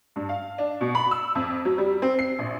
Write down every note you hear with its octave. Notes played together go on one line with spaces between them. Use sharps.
G2
F5
D4
B2
B5
E6
F2
F#3
G3
C4
C7
A#1